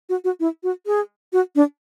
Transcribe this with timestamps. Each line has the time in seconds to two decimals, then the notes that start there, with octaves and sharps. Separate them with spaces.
0.09 F#4
0.24 F#4
0.40 E4
0.63 F#4
0.86 G#4
1.33 F#4
1.56 D4